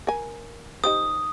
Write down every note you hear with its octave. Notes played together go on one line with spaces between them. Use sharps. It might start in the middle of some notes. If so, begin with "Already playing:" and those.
A#4 G#5
D#4 G4 C5 D#6